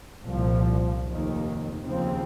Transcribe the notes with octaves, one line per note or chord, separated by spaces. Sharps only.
C2 A#2 F3
F1 D#2 D#3
D#2 C#3 F3 C4